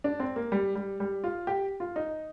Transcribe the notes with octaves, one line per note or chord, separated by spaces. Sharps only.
D4
C4
A#3
G3
G3
G3
F4
G4
F4
D#4